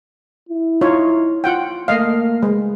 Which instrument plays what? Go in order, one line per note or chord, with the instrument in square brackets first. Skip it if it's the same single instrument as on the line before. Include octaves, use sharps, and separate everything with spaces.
[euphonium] E4
[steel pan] D#4 F4 C#5
F4 F#5 G5
[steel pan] A3 D#5 F5 [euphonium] A#3
[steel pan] G#3